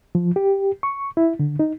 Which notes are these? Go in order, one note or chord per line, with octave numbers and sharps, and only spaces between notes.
F3
G4
C#6
E4
D3
D#4